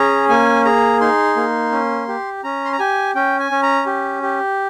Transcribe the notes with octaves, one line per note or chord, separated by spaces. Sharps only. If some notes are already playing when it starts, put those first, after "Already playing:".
Already playing: C#4 G#4 A#5
A#3 G#5
G#4 A#5
D#4 C6
A#3
C#4
G4
C#4 A#5
C6
A#5
G4 G#5
C#4 G5
G#5
C#4
A#5
G4
G4